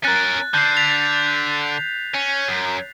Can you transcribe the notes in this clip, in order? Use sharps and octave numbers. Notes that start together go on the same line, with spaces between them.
C#4 A#4 F#6 A6
D3 G6 C7
B6 F7
C#4
F#2